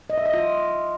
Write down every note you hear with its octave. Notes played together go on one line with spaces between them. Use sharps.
D#5
E5
D#5
F4